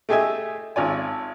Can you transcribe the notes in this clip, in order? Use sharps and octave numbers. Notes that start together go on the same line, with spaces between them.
A3 G4 G#4 D#5 E5 G#5
G#1 F4 C#5 D5 G#5